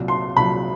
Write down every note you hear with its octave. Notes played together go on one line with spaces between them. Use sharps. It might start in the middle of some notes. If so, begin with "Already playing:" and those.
Already playing: C2 A#2 F#3
C6
C2 A#2 F#3 B5